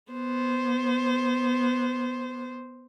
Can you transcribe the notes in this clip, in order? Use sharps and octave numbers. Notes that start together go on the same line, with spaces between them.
B3 C5